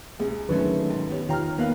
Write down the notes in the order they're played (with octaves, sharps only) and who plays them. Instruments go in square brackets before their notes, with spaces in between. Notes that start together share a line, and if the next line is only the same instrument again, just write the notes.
[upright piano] C#2 [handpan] G#4
[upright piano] D3 G#3 A3 [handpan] D#3 B4 [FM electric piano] F#3 C#4
[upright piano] G#2
B3 G4 C#5
[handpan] D#3 [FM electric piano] F4 G5 A#5 [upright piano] C#5 F6
[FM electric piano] A#3 B3 [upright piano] B4 F5 F#6